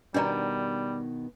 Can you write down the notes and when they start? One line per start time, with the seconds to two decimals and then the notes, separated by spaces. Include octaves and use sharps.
0.14 B2 D#3 G3 D4 D5 A#5